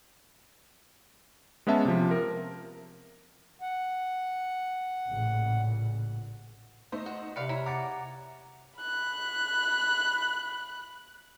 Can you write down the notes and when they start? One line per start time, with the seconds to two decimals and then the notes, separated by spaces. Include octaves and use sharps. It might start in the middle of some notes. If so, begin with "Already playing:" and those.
1.67 G#3 B3 C#4 E5 A5
1.85 C3 F3
2.11 A#4
3.62 F#5
5.08 A1 A#2 C#3
6.92 A3 D#4 C5
7.06 F#4
7.36 C3 B4 D5 F5 C#7
7.49 E4 C#5 A#5
7.66 F#5 A#5 D6 A6 C#7
8.79 B5 F#6